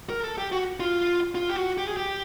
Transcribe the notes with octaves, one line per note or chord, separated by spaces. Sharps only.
A#4
A4
G4
F#4
F4
F4
G4
F#4
G4
G#4
G4